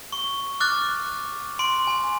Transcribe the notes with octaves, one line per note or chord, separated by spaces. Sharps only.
C#6
D6 F6 F#6 A6
C6 D7
G#5